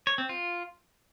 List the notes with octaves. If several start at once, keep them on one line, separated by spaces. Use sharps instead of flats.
C#5
C4
F4